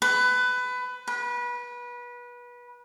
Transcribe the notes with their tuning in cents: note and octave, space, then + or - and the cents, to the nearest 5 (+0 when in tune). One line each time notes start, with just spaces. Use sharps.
B4 +20
B4 -25